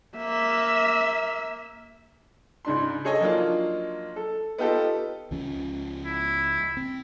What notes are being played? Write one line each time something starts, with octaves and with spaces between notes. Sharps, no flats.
A#3 E5
C#2 G#2 D4 C6
G#4 A4 C#5 D#5 G#5
F3 F#3 A#3 D4 D#4 F4
A4
B3 D#4 F4 G4 A4
C#2 F3 C#4
E4
C4